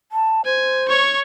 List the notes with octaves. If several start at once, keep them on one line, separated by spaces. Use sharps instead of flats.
A5
C5 G#5
C#5 C#6